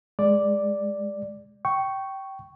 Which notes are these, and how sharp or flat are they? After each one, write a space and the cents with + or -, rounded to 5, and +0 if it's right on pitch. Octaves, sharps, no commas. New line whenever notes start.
G#3 +0 D5 +0
G5 -15 C#6 +0